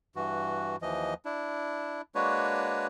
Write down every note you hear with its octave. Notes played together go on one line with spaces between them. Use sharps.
G2 E3 F#4
D#2 E3 F3 D#5
D4 E4
G#3 A#3 D4 F#4 B4 C#5